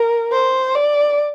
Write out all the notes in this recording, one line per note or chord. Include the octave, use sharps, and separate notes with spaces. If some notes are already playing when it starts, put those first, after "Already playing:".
Already playing: A#4
C5
D5